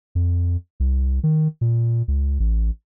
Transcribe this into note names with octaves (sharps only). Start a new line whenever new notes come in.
F2
C2
D#3
A#2
C#2
A1